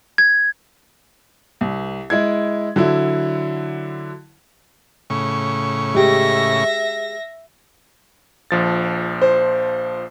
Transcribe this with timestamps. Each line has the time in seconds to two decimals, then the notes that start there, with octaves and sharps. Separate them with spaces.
0.18 G#6
1.61 C2
2.10 G#3 E4 G#6
2.76 D3 F#3 E4
5.10 A2 C#3 C#6
5.94 G#3 G4 E5 A#6
8.51 A#1 F3 A6
9.21 C5